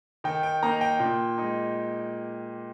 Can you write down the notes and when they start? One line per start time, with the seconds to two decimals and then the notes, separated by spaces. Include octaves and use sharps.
0.24 D#3 G5
0.43 G5
0.63 A#3 D#4 A#5
0.81 G5
1.00 A#2
1.38 G#3 D#4